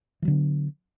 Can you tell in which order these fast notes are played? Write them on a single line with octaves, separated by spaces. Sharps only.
E3 F#3 D3 B3